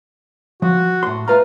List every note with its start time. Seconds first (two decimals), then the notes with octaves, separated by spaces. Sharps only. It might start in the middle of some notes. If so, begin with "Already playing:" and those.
0.62 F3 F#4
1.03 A2 C6
1.28 A3 F4 B4 A#5